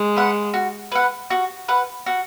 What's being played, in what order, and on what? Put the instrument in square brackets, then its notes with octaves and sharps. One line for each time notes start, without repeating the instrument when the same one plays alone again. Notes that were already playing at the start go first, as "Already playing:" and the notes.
Already playing: [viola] G#3
[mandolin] B4 F#5
F#4
B4 F#5
F#4
B4 F#5
F#4